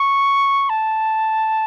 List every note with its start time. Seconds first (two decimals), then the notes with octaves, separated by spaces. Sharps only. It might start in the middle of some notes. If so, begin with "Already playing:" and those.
Already playing: C#6
0.69 A5